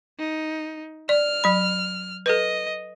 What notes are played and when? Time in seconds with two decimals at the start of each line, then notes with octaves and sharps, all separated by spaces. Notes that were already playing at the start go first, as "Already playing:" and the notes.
0.19 D#4
1.09 D5 F6
1.44 F#3 B5
2.26 A4 B4 D#5